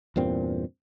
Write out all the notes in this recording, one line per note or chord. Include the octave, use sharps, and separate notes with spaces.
E2 G2 A#2 C4